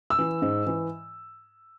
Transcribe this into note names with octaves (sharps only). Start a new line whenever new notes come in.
E6
E3
G#2
E3